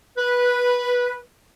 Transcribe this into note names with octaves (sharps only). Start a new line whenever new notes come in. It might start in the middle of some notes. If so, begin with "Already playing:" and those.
B4